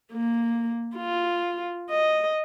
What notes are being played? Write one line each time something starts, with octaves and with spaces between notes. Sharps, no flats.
A#3
F4
D#5